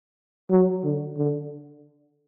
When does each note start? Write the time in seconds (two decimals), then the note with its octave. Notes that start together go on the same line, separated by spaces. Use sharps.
0.50 F#3
0.84 D3
1.18 D3